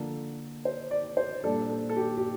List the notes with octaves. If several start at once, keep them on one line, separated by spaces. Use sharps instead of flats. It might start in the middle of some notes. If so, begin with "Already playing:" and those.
Already playing: D3 F3 A#3 D4 A4
C5
D5
C5
A#2 G3 D4 A4
A4
A4
G4
G4